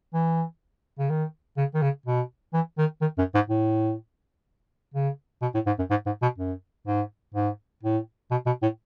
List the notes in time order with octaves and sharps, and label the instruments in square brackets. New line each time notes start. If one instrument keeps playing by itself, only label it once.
[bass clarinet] E3
C#3
D#3
C#3
D#3
C#3
B2
E3
D#3
D#3
F#2
G#2
A2
C#3
B2
A2
G#2
F#2
G#2
G#2
B2
F#2
G#2
G#2
A2
B2
B2
A2